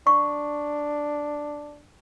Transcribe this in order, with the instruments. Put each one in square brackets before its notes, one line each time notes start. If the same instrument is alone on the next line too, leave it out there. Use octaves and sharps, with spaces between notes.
[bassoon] D4 [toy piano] C#6